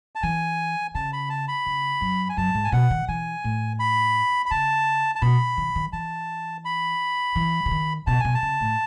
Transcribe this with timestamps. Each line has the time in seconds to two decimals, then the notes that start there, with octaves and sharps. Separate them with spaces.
0.15 A5
0.23 E3 G#5
0.95 C#3 A5
1.13 B5
1.30 A5
1.48 B5
1.66 C#3
2.01 F#2
2.29 G#5
2.37 F#2 A5
2.54 G#2
2.64 G#5
2.72 B2 F#5
2.90 D#3
3.08 E3 G#5
3.44 A2
3.80 B5
4.46 B5
4.51 C#3 A5
5.15 A5
5.21 B2 B5
5.57 D#3
5.75 D#3
5.93 E3 A5
6.65 B5
7.35 E3
7.66 C#3
7.71 D#3
8.07 B2 A5
8.20 B2 G#5
8.34 A5
8.42 C#3
8.61 A2